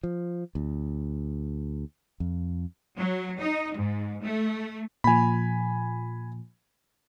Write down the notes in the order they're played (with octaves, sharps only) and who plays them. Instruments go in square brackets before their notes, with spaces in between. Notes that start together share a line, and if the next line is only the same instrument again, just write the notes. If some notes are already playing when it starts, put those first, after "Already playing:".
[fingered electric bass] F3
D2
F2
[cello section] F#3
D#4
G#2
A3
[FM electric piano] A#2 F3 [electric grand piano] G#5 B5